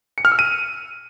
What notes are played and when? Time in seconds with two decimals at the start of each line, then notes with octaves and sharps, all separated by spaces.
0.18 C#7
0.25 F6
0.32 E6
0.39 D#7